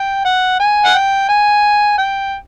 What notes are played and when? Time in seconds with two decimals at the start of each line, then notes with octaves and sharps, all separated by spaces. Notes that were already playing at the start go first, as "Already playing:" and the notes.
Already playing: G5
0.25 F#5
0.60 G#5
0.85 F#5
0.94 G5
1.29 G#5
1.98 G5